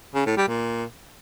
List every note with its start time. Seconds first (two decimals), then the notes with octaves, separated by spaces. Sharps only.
0.15 C#3
0.26 A2
0.37 G3
0.48 A#2